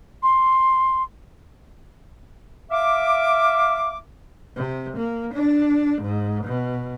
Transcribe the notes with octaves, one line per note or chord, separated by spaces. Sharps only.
C6
E5 F5 D6
C3
A#3
D4
G#2
B2